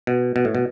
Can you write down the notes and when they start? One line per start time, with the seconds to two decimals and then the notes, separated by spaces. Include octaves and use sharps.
0.07 B2
0.36 B2
0.45 A2
0.55 B2